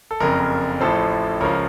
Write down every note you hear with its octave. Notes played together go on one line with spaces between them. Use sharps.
A4
F#1 F2 C#3 A#4
A1 A2 F3 A4 C5
C#2 C#3 F3 A#4 C#5